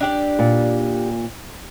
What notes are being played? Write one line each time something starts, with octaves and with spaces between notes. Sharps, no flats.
D4 G4 D5
A#2